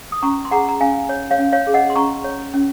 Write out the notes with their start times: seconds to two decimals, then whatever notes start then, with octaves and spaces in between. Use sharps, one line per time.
0.12 D#6
0.22 C#4 A#5 C#6
0.45 C6
0.51 G#4 F#5 A#5
0.68 A#5
0.80 C#4 F5 G#5
1.09 C#5
1.31 C#5 F5
1.38 C#4
1.52 C#5 F5
1.67 G#4
1.74 D#5 F#5
1.90 C6
1.96 C#4 A#5 C#6
2.24 C#5
2.54 C#4